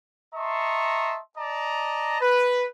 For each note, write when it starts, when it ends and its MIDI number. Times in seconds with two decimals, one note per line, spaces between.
0.34 1.18 75
0.34 1.18 76
0.34 1.18 81
0.34 1.18 82
0.34 1.18 84
0.34 1.18 85
1.37 2.21 74
1.37 2.21 75
1.37 2.21 81
1.37 2.21 82
2.21 2.66 71